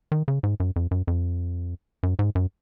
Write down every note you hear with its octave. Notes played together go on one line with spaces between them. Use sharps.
D#3
C#3
G#2
F#2
F2
F#2
F2
F#2
G#2
F#2